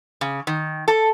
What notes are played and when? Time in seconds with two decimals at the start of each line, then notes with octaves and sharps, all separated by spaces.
0.21 C#3
0.47 D#3
0.88 A4